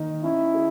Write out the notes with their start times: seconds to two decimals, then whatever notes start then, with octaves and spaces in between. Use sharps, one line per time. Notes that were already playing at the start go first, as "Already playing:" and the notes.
Already playing: D#3 A#3 D#4
0.24 C#4 E4
0.54 G#4